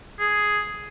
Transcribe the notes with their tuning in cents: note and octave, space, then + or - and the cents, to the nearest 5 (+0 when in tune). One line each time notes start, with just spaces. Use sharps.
G#4 +5